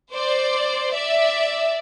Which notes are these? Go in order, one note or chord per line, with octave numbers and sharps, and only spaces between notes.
C5 D5
D5 E5